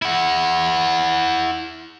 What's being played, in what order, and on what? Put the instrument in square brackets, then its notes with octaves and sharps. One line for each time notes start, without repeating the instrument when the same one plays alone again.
[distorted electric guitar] E4 F#5